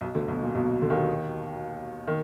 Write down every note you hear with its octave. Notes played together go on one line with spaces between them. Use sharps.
B1 B2
D2 D3
B1 B2
A#2
B1 B2
D3
D#2 D#3
D#3